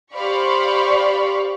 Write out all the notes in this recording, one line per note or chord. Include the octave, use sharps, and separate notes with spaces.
G4 C5 D5 F5 B5 C#6